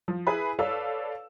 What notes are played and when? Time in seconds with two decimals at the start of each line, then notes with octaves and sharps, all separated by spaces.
0.08 F3
0.27 E4 G#4 B4 G#5 B5
0.59 A4 B4 C#5 D5 F5 E6